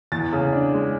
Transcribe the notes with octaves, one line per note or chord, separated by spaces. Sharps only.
E2 A6
C#3
D4
G#3